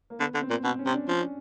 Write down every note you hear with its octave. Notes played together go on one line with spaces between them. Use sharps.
A#3
D3 B3
D3
C4
A#2
B2 C4
C#4
C3
D4
F3 C#4
D4